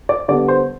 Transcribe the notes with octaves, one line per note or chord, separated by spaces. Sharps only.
D5
D3 G3 B3 D5
C5